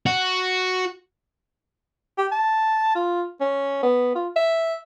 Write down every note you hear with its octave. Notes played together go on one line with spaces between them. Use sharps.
F#4
G4
A5
F4
C#4
B3
F4
E5